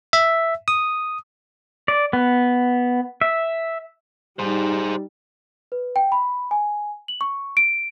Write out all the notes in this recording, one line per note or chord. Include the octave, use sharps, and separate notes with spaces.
E5
D#6
D5
B3
E5
G3 D#4 G#4 C5
B4
G5
B5
G#5
F#7
C#6
D7